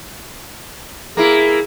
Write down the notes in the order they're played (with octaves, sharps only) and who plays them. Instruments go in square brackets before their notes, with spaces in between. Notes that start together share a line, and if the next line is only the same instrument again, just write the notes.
[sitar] A#3 E4 [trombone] G#4